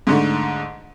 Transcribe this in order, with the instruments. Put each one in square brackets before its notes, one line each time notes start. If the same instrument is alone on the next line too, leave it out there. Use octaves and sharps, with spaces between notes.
[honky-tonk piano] G#2 D3 A3